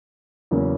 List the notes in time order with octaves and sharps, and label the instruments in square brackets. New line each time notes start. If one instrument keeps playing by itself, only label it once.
[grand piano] E2 C#3 F#3 A#3 C#4